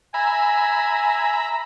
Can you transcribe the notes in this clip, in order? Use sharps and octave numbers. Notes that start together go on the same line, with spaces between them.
E5 G#5 A#5 B5